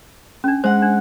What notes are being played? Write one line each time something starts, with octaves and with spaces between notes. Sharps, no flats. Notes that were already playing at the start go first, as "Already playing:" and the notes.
C#4 D4
G#3 C5 F#5
D4